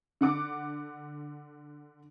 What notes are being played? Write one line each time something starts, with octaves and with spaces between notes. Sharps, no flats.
D3 F#5 D6